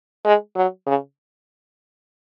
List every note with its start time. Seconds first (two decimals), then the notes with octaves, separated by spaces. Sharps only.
0.25 G#3
0.56 F#3
0.87 C#3